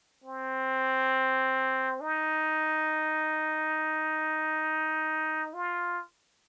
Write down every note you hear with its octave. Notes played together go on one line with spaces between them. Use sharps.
C4
D#4
F4